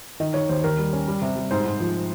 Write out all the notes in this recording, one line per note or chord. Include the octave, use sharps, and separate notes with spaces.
D#3 D#5
D#3 C#5
D#2 C5
D#2 A#4
G3
C#4
G3
C3
G3
G#2 C5
G#2
F3